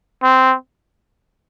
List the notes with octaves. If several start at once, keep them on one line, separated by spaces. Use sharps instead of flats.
C4